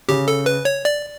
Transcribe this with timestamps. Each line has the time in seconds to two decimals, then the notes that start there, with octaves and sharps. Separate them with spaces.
0.09 C#3 G4
0.28 A4
0.46 B4
0.65 C#5
0.85 D5